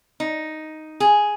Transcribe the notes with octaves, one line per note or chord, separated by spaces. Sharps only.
D#4
G#4